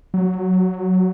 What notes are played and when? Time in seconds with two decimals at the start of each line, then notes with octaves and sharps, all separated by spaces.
0.14 F#3